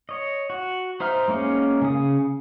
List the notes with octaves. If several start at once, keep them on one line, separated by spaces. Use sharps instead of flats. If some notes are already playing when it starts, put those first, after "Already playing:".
C#5 D#5
F#4
D#4 C5 E5 F6
G#3 A#3 C#4 D#4
C#3 D#6